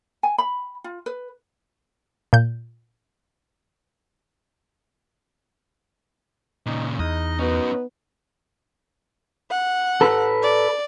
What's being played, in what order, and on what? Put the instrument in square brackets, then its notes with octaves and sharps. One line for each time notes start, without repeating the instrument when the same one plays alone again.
[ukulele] G#5
B5
F4
B4
[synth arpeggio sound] A#2 G6
[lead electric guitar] A#2 C#3 [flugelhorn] D#4
[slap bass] E2 [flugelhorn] D#4 [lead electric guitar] D#5
[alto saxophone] B3 [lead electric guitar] C#4 F#4
[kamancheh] F#5
[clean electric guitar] A4 B4
[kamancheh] D5